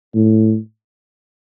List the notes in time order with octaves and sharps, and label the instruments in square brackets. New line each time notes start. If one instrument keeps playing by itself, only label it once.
[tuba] A2